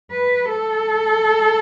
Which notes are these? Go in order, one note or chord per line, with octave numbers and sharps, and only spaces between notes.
B4
A4